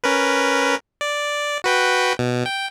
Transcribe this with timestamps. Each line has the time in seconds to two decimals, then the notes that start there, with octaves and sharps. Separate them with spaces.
0.04 C#4 A#4 B4
1.01 D5
1.64 F#4 B4 G5
2.19 B2
2.46 G5